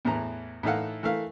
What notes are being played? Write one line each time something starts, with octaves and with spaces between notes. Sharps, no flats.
E2 A2 E3 A#5
A2 E3 D#4 A4 F5 F#5
E3 A3 A#4 F5